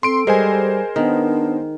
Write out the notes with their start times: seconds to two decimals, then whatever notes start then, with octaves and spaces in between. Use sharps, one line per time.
0.03 C4 A4 C6 D7
0.27 G3 G#3 A#4 C5 G#5
0.96 D#3 B3 D4